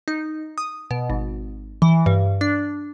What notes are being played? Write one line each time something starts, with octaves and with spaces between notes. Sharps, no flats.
D#4
D#6
B2
G#1
E3
G2
D4